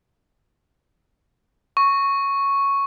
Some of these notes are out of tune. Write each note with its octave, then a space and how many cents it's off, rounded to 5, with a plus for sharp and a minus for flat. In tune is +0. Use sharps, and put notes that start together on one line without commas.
C#6 +0